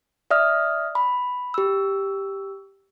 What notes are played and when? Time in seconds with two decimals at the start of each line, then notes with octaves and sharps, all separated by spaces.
0.31 D5 E5 D#6 F6
0.95 B5
1.54 G4 E6